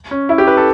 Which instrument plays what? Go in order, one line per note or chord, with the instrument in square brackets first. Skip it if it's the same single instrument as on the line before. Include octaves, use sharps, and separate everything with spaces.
[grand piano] C#4
E4
G4
B4
A4